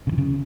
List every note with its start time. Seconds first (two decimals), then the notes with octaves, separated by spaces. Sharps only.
0.07 C#3
0.12 E3
0.18 C#3